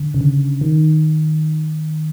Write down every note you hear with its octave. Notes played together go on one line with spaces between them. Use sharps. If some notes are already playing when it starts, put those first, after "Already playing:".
Already playing: D3
C#3
D3
D#3